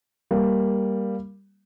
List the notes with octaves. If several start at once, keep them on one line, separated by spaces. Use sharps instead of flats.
G3 A#3